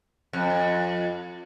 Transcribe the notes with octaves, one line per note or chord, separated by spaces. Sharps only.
F2